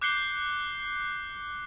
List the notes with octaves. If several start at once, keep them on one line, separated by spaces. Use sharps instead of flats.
D6 F#6 G6 C7 C#7 G7